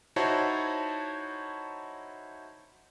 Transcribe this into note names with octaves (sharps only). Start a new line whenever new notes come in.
D#4 E4 F#4 C5 C#5 A5